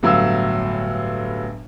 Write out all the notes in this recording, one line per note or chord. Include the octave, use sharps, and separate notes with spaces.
G1 A2 F#3 F5 E6